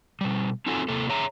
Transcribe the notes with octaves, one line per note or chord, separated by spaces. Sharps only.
B2 G3
C4 D#4 F4 F#4 A4 G#5
C3 A#3 A4
G#4 C#5 E5 A#5